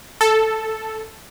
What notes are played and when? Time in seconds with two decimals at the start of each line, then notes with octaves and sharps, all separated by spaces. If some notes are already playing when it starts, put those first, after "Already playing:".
0.21 A4